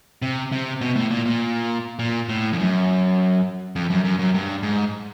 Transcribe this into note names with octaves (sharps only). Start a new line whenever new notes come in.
C3
C3
B2
A2
A#2
A#2
A#2
A2
F2
F#2
F2
F#2
F#2
F#2
G2
G#2